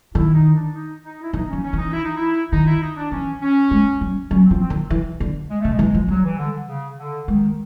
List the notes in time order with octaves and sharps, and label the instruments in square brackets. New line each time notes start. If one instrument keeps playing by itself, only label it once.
[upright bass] D#3 [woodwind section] E4
[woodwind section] D#4
D4
D#4
D#4
E4
[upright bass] E3 [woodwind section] D#4
[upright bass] F3 [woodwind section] C#4
[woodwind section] C#4
[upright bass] E3 [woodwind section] D#4
[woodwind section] E4
D#4
E4
[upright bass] D#3 [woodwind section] D#4
[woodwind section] E4
D#4
D4
[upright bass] E3 [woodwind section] C#4
[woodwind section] C#4
[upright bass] G#3
G3
[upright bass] F#3 [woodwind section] C#4
[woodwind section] C4
[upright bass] F3
[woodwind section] C4
[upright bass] D#3
E3
D3
[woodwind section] G#3
[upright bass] C#3 [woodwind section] A3
[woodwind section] G#3
[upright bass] E3
F3
[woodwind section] F#3 [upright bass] G3
[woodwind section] E3
D3
C#3
D3
[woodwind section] D#3 [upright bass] G#3